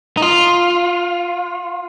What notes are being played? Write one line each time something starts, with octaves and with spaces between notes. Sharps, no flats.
D#4
F4